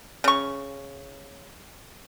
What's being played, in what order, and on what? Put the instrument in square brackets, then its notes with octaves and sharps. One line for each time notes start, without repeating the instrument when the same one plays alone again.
[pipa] C#3 C#6